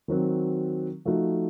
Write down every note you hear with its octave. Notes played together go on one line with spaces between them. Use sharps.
D#3 F#3 C4 F#4
F3 A3 D#4 F#4